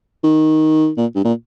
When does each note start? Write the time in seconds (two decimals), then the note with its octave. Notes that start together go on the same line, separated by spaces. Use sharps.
0.24 D#3
0.97 A#2
1.15 G2
1.25 A#2